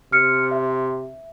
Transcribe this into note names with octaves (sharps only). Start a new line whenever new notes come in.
C3 F6 C#7
E5